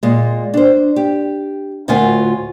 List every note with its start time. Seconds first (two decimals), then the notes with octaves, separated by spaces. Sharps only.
0.03 A#2 G#3
0.54 D4 C5
0.96 G4
1.88 D2 A2 F4 A#4 F#5 G#5